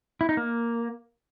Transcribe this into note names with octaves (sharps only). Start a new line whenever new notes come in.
E4
D#4
A#3